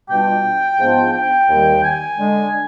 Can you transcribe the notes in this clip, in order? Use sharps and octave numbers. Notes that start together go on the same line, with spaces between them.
B2 G3 D4 F4 G5
G#2 F3 B3 D4 F4
G5
D#2 D#3 G3
G#5
D3 G#3 D4